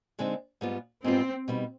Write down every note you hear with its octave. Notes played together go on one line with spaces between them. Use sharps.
D3 G#3 C4 D#4
G#2 G3 B3 F4
G#2 G3 B3 C4 F4
B2 G3 B3 D#4